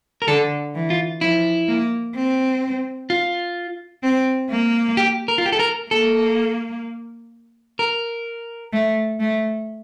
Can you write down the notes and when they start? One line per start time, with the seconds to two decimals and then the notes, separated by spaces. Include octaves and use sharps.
0.22 A#4
0.28 D3 A4
0.75 E3
0.90 F4
1.21 F3 E4
1.68 A#3
2.15 C4
3.10 F4
4.03 C4
4.50 A#3
4.97 G4
5.28 A#4
5.38 F4
5.46 G4
5.52 A4
5.59 A#4
5.91 A#3 A4
7.79 A#4
8.73 A3
9.20 A3